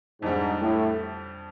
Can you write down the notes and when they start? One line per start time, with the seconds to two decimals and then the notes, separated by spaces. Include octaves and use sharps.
0.22 F2 G#2 D3 G3
0.60 A2